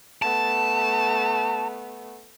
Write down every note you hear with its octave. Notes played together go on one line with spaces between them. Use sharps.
A3 B3 A5